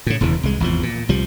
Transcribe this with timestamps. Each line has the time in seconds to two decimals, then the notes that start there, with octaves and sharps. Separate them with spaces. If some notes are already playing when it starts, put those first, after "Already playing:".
0.06 A2 C#3
0.21 E1 E2 C#3 E3
0.43 C2 G#3
0.60 G#1 E2 F3
0.83 A#2
1.09 C2 F3 G3